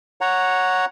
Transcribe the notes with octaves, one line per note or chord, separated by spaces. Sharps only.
C#5 F#5 A#5